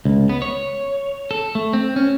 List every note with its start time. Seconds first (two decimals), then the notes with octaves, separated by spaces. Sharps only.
0.05 C#2
0.29 B3
0.42 C#5
1.31 A4
1.55 A3
1.73 C4
1.96 C#4